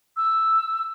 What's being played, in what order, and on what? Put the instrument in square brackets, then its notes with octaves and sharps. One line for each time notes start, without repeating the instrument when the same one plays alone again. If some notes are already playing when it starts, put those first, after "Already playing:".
[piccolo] E6